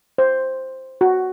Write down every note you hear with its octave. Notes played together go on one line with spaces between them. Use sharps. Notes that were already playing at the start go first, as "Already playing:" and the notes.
C5
F#4